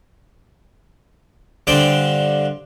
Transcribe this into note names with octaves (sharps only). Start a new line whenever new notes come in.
G2 D3 C5 D5 G5